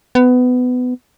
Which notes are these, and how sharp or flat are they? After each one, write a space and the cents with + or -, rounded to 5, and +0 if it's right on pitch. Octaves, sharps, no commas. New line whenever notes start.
B3 +20